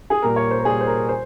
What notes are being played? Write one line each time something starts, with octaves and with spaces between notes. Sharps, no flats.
G#4
A#2 G3 A#4
C#5
C5
A#4
A#2 G3 G#4
C5
A#4
C5